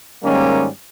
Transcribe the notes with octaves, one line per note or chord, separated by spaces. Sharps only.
G#2 D#3 G3 G#3 A#3 C#4